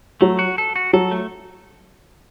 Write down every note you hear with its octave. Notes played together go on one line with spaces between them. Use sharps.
F#3 A3
F#4
A4
F#4
F#3 A4
A3